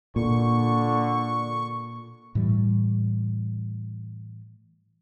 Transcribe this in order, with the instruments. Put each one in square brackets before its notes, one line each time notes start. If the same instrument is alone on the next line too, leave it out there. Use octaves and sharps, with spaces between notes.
[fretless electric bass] A#2 [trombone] D3 [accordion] C#6
[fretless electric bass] A2 E3 G3